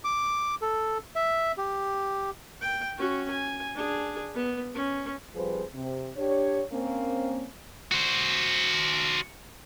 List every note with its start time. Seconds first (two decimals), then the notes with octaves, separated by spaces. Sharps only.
0.04 D6
0.62 A4
1.16 E5
1.58 G4
2.61 G5
2.98 C#4 F#4
3.31 G#5
3.75 D4 G#4
4.34 B3
4.74 C#4
5.34 F2 F3 G3 G#4 B4 C5
5.73 C3
6.16 D4 G4 C#5
6.71 A#3 C4 C#4
7.92 F#4 C5